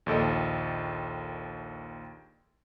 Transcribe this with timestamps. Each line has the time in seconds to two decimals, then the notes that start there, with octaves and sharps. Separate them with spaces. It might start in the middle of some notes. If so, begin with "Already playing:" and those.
0.06 A#1 D#2 A4 D#5